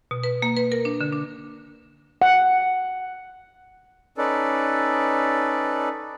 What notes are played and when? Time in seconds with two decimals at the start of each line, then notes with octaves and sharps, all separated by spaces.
0.11 B2
0.23 B4
0.42 A#3
0.57 B4
0.72 A#4
0.85 D4
1.01 D3
1.13 D4
2.22 F#5
4.18 C#4 D#4 A4 B4 D5